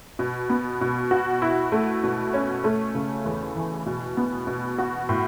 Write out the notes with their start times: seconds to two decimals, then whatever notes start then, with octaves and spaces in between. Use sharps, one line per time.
0.19 B2
0.50 B3
0.81 B2
1.11 F#4
1.42 E4
1.72 A3
2.04 B2
2.34 C#4
2.64 A3
2.95 C#3
3.25 E2
3.55 E3
3.86 B2
4.17 B3
4.47 B2
4.78 F#4
5.09 A2